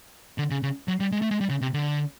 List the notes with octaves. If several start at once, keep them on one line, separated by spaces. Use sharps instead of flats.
D3
C#3
C#3
F#3
G3
G#3
A3
G#3
G3
C#3
C3
D3